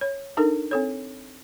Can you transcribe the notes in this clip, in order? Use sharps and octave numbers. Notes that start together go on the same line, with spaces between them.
C#5
D4 D#4 A4 A#4
C4 A4 C#5